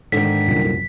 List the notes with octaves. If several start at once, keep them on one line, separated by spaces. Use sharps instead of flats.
G#2 D3 D#3 B6
C2 F#2 A#2